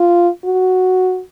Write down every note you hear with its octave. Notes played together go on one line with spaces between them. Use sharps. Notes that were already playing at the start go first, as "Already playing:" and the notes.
Already playing: F4
F#4